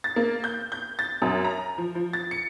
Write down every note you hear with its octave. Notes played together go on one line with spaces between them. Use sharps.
A6
A#3
G6
G6
A6
F#2
A#5
F3
F3
A6
C#7